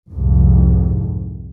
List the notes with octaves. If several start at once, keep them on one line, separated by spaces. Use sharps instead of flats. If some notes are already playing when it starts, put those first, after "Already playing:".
C2 F2 G#2